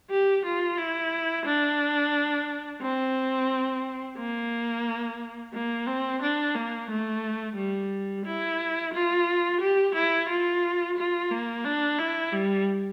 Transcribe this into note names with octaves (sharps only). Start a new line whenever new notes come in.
G4
F4
E4
D4
C4
A#3
A#3
C4
D4
A#3
A3
G3
E4
F4
G4
E4
F4
F4
A#3
D4
E4
G3